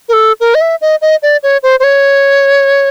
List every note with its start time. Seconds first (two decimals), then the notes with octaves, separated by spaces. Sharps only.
0.09 A#4
0.13 A4
0.40 A#4
0.55 D#5
0.61 E5
0.81 D#5
1.02 D#5
1.23 D5
1.43 C#5
1.63 C5
1.80 C5
1.84 C#5